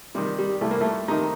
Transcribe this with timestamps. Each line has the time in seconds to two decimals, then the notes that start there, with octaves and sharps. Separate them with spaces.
0.15 C3 D#3 G3
0.38 G3
0.61 C2 A3
0.71 A#3
0.81 A3
1.08 C3 D#3 D#4